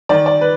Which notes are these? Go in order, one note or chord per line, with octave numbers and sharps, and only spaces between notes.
D#3 D5
D5
B4